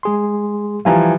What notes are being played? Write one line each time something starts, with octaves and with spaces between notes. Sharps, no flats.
G#3 G#4 C6
E3 F3 G3 F5 G#5 A#5